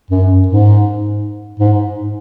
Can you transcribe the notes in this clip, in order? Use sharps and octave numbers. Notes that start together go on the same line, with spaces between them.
F#2
G#2
G#2